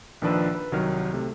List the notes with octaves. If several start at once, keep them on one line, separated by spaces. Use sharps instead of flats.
A#1 D#3 F3 D4 B4 E6
B4
C2 D#3 F#3 F6
C3 A3